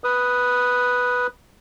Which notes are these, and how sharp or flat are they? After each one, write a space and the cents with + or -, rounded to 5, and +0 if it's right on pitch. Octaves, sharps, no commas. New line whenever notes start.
B4 +0 D#6 +0